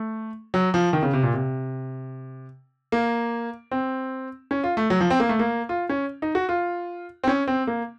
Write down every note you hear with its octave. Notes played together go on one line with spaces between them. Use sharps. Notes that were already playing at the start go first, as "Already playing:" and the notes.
Already playing: A3
F#3
F3
D#3
C#3
C3
A#2
C3
A#3
C4
C#4
F4
A3
F#3
F3
C4
A#3
A3
A#3
F4
C#4
D#4
F#4
F4
C4
C#4
C4
A#3